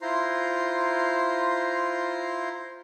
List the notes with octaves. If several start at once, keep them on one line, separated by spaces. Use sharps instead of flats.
E4 F4 C5 A#5 C6